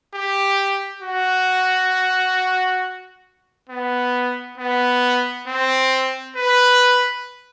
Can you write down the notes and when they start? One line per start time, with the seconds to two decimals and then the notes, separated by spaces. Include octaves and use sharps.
0.14 G4
1.02 F#4
3.70 B3
4.58 B3
5.48 C4
6.36 B4